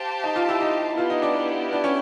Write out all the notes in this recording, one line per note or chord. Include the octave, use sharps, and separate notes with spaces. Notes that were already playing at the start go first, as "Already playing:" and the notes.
Already playing: G4 C5 F5 A5
D#4
F4
E4
D#4
B3 E4 F4 G4
D#4
D4
D4
C#4